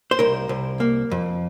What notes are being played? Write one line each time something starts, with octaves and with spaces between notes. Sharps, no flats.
C5
C2 A#4
C2
A#3
F2